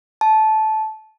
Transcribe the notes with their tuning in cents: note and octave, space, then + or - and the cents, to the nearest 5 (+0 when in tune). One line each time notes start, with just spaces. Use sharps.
A5 -15